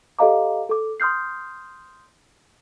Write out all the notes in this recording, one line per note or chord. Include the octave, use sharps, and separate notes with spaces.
G4 A4 D#5 F5 A#5 D6
A4 D6
C6 D#6 F6 G6 C7